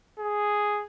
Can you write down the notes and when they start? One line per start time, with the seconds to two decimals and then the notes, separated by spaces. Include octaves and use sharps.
0.19 G#4